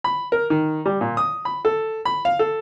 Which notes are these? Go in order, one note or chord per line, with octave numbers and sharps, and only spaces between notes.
B5
A#4
D#3
G3
A#2
D#6
B5
A4
B5
F5
A4